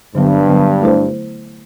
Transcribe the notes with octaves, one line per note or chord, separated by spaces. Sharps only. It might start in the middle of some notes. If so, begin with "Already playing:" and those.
G2 D3 F#3 B3
D3 F#3 B3
A3 E4 A4 C5